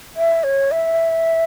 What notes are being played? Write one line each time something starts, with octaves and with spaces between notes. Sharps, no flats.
E5
C#5
E5